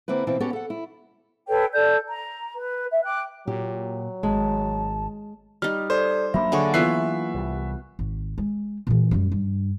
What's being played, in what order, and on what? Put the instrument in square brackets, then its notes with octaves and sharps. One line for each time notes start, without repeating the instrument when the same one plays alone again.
[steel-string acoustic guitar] D3 A#3 C4 E4 B4
B2 E3 C4 E4 F4
B3 C#4 F#4 G4 A4 C#5
A4 F#5
E4
[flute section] A4 B4 C#5 G5
A4 D5 G6
A#5
B4
E5
G5 D6 F#6
[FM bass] A#2 [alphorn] F#3 [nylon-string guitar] G4
[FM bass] G#1 [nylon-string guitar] G#3 [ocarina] A5
[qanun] G3 D#4 [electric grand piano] F6
[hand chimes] A4 D5 [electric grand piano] C5
[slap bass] F#3 A#3 D4 [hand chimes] E5 B5
[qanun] D3 G#4 C#5 [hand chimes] F#5 G#5 C#6
[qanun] E3 B3 F4 [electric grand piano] E5 F#6 C7
[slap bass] C2 G3
[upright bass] G#1
G#3
A#2 E3
F#2 G3
G2